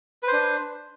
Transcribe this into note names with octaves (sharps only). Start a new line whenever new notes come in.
D4 B4 C5